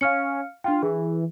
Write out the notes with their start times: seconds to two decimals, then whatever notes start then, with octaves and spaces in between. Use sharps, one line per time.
0.01 C#4 F5 F6 C#7
0.64 D4 F4 G5
0.83 E3 G#4